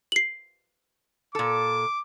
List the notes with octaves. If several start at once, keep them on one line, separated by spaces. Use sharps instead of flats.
C7 F#7
A#2 A4 D6